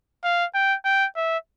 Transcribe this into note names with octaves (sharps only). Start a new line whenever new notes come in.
F5
G5
G5
E5